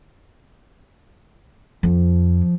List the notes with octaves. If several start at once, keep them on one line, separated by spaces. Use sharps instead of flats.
F2 F3